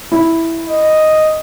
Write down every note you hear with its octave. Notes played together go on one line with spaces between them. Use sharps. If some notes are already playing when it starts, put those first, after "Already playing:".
E4
D#5